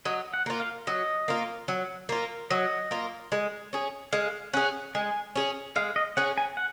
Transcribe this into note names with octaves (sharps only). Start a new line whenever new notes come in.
F#3 D#5
F#5
A#3 F4
F5
F#3 D#5
A#3 F4
F#3
A#3 F4
F#3 D#5
A#3 F4
G#3
C#4 G#4
G#3 F5
C#4 G#4 F#5
G#3 G#5
C#4 G#4
G#3 F5
D#5
C#4 G#4 F#5
G#5
F#5